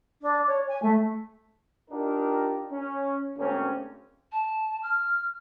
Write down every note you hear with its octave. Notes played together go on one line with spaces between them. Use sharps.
D4
C#5
G#5
A3
D4 D#4 F4 G4 A#4
C#4
D2 G#2 A#3 C4 C#4
A5
F6